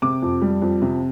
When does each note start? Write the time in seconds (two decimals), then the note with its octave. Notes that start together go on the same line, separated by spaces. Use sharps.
0.02 C3 D6
0.22 F2
0.42 G3
0.62 F2
0.82 C3